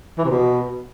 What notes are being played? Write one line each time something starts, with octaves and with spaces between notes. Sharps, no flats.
E3
C3
B2